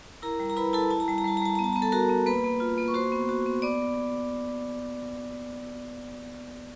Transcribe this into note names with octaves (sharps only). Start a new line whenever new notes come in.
E4 A#4 A#5
G3
A#5
E4 B4 B5
E4 A4 A5
E4 A5
A#5
G3 A5
A#5
G3 A5
A#5
G3 A5
B3 A#5
A5
B3 A#5
A4 A5
F#4 A#4 A#5
B3
A#3 B4 B5
A#3
F4
A#3
C#6
F#4 C5 C6
B3
F#4
B3
B3 D5 D6